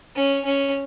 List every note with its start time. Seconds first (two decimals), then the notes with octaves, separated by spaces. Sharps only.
0.16 C#4
0.45 C#4